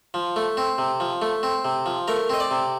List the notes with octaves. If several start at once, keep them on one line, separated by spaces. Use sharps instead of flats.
F3
A3
C4
C3
F3
A3
C4
C3
F3
A3 A#4
C4 D#5
D5
C3